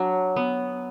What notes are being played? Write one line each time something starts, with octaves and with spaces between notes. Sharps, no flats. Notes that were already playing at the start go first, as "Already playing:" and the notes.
Already playing: F#3 D4
B3